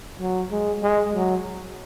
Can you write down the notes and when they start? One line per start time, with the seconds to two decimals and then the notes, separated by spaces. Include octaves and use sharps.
0.20 F#3
0.51 G#3
0.83 G#3
1.14 F#3